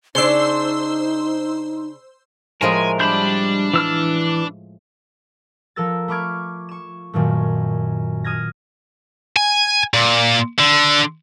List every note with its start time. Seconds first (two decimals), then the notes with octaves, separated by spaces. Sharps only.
0.15 C#3 D4 D#4 C5 C6 E6
2.61 A2 F3 G#3 A#4 G#5
3.00 G3 D4 B5 G6
3.74 E3 E6 F6
5.76 F3 A4 A#4 E6 A6
6.08 A3 B5 C#6 D6 F6 G#6
6.69 C#6 E7
7.14 F#2 A#2 D#3 A3
8.24 D#6 F6 G#6 A#6
9.37 G#5
9.94 A#2
10.59 D3